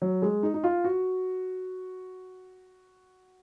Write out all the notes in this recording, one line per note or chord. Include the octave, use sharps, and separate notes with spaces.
F#3
G#3
D#4
D#4
F4
F#4